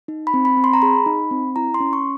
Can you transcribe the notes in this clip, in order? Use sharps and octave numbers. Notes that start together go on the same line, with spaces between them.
D#4
B5
C4
B5
C4
C6
A#5
G#4 B5
D#4
C4
E4 A#5
C6
C#4
C#6